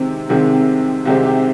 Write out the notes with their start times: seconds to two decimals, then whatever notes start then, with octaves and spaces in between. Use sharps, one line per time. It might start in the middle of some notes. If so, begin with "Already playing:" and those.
Already playing: C3 D#3 G#3 C4
0.29 C2 C3 D#3 G#3 C4
1.06 C2 C3 D#3 G#3 C4 G4
1.25 G4